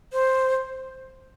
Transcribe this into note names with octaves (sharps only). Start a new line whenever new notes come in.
C5